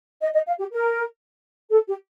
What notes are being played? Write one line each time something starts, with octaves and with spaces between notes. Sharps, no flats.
D#5
D#5
F5
G4
A#4
A4
G4